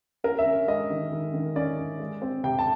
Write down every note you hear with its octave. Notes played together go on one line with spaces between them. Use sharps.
C#4 A#4
E5
C#4
G#3 D#5
D#3
D#3
D#3
C#4 D5
C#4
G#3
C4
C3 G5
A5